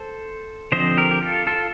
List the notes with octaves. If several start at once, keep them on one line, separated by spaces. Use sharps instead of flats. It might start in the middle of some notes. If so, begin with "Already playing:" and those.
Already playing: A4 C5
D3 F3 C4 C5 D#5
G4 A#4
G4
F4 A4
F4 A4